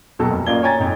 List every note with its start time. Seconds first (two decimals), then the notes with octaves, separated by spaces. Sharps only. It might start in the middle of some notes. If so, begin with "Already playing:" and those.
0.19 D#2 B2 F#3 A4
0.31 F1
0.46 A1 A#3 F4 D5 G#6 G7
0.63 C#5 G5 G#5 A#5 G#6 A6
0.79 F2 G#2